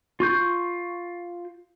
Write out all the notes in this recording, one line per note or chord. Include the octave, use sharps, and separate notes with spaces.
F4 C#6 G6